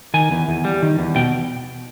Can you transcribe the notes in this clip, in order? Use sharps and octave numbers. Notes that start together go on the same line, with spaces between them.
D#3 G#5
E2
E2
G3
D#3
E2
B2 G5